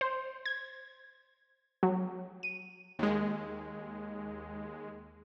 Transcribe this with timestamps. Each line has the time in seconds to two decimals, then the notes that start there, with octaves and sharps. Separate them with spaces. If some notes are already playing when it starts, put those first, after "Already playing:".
0.01 C5
0.45 G#6
1.83 F#3
2.43 D#7
2.99 D#2 G#3